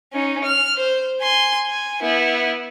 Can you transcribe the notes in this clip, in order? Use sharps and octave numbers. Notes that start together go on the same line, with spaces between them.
C#4 D#4
F6
C5
G#5 C6
G#5
B3 E4